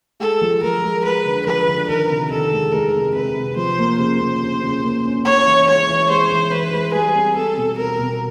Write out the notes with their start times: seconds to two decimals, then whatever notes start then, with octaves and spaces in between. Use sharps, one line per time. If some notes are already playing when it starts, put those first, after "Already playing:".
0.20 G#3 A4
0.41 F3
0.63 F3 A#4
0.83 G#3
1.04 G#3 B4
1.25 D3
1.46 F3 B4
1.67 D3
1.88 D#3 A#4
2.10 C3
2.30 D#3 A4
2.52 G#3
2.72 G#3 A#4
2.94 C3
3.15 C3 B4
3.36 C3
3.56 F3 C5
3.78 A#3
3.99 C#3 C5
4.20 A#3
4.42 C#3
4.62 C#3
4.84 A#3
5.05 C#4
5.25 C#4 C#5
5.46 E3
5.67 G#3 C#5
5.89 E3
6.10 G#3 C5
6.31 E3
6.51 E3 B4
6.73 G#3
6.94 G3 G#4
7.15 C4
7.35 C4 A4
7.57 B2
7.78 C4 A#4
7.99 B2